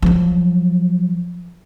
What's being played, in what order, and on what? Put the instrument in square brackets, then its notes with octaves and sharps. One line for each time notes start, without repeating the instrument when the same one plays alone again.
[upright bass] F3 F#3